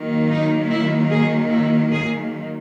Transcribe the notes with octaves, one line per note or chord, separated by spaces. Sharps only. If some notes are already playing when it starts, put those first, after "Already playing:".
Already playing: D#3 F#3 A#3
D#4
E4
G#4
E4
G#4